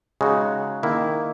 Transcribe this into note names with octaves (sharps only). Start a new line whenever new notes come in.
C#3 G#3 D#4 F#4
D#3 A#3 E4